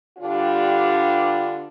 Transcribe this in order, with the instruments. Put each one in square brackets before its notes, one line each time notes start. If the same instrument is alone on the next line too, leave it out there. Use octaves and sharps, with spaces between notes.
[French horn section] G2 D3 G3 D4 F4